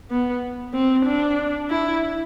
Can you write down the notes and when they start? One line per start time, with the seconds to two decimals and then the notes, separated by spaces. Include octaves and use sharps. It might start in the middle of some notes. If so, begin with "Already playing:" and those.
0.11 B3
0.74 C4
1.06 D4
1.69 E4